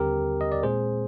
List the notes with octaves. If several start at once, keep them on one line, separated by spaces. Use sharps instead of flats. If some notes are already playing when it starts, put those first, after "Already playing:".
Already playing: D#2 D3 G3 C4 G4 A#4
D#5
D5
A#2 G#3 C4 G#4 C5